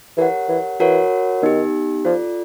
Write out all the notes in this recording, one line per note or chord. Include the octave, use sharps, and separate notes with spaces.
E3 G4 A#4 C#5 F#5
E3
E3 F#4 A#4 C#5 F#5
D#3 B3 D#4 G4
F3 F4 A4 D5